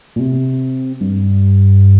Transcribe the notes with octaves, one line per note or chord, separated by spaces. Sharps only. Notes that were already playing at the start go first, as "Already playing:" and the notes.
A#2
C3
G2